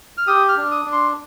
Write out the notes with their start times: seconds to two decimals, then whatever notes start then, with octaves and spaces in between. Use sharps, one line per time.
0.18 F6
0.27 G4 D#6
0.49 F6
0.57 D4
0.71 D#6
0.85 D4
0.92 C6